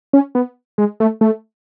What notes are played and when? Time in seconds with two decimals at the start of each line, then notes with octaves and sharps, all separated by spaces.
0.13 C#4
0.35 B3
0.78 G#3
1.00 A3
1.21 A3